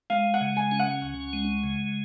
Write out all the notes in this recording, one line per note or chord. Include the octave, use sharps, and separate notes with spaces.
G#3 F5
F#5
C#3
G#5
C#4
F#5
C#2
G#3
C#3